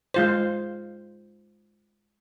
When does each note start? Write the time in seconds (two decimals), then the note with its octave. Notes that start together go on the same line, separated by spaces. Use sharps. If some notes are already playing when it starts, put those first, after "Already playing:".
0.14 G#3 F4 C5